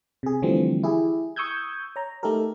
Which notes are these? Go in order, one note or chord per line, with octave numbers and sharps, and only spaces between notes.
C3 G#4
D3 E3 F3 G3 A3 C4
E4 G4 G#4
C#6 D#6 E6 G6 G#6
C#5 A#5
A3 D#4 G4 A4 A#4